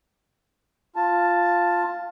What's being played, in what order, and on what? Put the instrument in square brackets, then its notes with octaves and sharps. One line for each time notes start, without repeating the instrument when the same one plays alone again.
[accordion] F4 A5